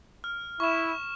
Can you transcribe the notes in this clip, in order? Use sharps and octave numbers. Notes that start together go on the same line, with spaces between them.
F6
E4 C#6 E7